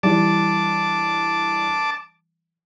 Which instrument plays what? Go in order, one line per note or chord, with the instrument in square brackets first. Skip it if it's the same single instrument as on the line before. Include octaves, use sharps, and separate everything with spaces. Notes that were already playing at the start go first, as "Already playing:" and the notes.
[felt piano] E3 G3 [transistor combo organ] A5 D6